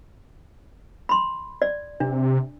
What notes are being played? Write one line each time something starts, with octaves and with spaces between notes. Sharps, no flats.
B5 C6
D5
C3 D4